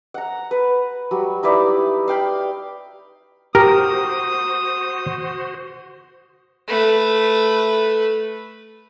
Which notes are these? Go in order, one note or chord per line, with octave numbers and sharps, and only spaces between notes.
F#5 A#5
B4
F#3 G3
D#4 E4 B4 D5
F5 G5 B5
F#4 G4 A#4 C5 D#6
A3 B4